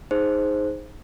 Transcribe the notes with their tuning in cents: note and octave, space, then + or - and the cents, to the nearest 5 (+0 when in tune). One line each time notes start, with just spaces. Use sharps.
D#4 +0 G#4 +0 C5 +0